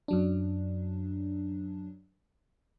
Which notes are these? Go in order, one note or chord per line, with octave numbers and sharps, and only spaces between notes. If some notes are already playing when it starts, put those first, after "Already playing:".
F#2 F#3 D4